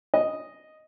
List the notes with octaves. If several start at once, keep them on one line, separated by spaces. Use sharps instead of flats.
D#5